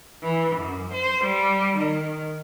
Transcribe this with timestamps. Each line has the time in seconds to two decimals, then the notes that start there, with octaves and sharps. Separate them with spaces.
0.23 E3
0.56 F#2
0.93 C5
1.24 G3
1.78 D#3